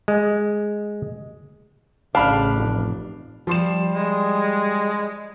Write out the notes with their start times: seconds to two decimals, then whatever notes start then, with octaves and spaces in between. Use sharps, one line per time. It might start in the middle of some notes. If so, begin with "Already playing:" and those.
0.08 G#3
2.15 A1 C#3 D4 F5 B5 F6
2.55 F1
3.47 F3 G3 C6 E7
3.94 G#3